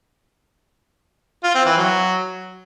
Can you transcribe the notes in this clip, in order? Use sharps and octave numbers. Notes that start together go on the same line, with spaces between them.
F4
C4
E3
F#3